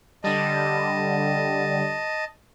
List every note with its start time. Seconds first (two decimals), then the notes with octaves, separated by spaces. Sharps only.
0.24 D3 G3 D#5 A5